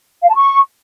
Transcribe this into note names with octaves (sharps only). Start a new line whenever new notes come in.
F5
A5
C#6